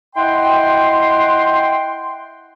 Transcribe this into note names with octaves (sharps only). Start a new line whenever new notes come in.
E4 D#5 F#5 G5 C6